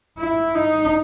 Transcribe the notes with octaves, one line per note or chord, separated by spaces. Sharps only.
E4
D#4